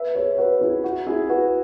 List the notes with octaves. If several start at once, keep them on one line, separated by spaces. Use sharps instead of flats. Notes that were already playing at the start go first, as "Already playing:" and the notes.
Already playing: B4 E5
G#4 C#5
F#4 B4
E4 G#4
F#4
E4 G#4
F#4 B4